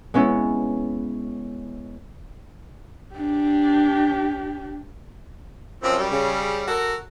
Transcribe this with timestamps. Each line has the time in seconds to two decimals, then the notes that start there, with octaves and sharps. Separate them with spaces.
0.14 G#3 B3 C#4 E4
3.15 D4 G4
5.83 F#2 F3 C4
5.98 G3
6.11 C#3
6.68 F#4 A4 A#4